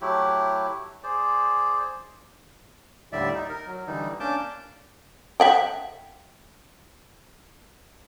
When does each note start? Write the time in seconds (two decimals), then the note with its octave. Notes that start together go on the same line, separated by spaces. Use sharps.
0.01 F#3 A3 E4 G4
1.03 G#4 C5 D5
3.13 D#2 A2 D3 G3 D5 E5
3.34 D#4
3.49 A#4
3.67 F#3
3.87 D3 E3 G3 D#4
4.20 A#3 C#4 D4 A5 D6 G6
5.40 E5 F#5 G5